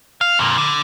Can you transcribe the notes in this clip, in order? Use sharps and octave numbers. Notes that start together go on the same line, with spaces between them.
F5
F2 A#2
D3